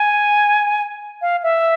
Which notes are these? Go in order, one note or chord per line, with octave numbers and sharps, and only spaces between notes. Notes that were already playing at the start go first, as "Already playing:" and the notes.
Already playing: G#5
F5
E5